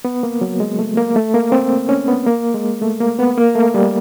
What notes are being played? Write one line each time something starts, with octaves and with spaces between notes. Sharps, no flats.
B3
A#3
F#3
G#3
A3
A#3
A3
A#3
C4
C#4
B3
A#3
G#3
A3
A#3
B3
A#3
A3
G3